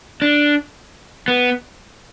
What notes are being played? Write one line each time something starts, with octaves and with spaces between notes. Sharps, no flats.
D4
B3